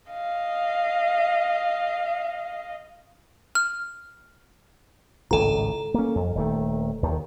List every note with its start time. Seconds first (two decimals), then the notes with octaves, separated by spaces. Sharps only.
0.10 D#5 F5
3.55 F6
5.31 G#1 C#2 A2 A4 A#5
5.94 A#3 C#4
6.15 F2
6.35 D#1 D#3 A3
7.03 D#2 D#3